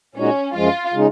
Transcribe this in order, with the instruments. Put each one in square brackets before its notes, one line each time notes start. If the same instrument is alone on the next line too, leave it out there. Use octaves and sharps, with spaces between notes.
[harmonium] A#2 G#3 D#4 F#4 [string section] C#4
[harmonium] F#2 F3 G#3 [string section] F4
[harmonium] C#3 G#3 D#4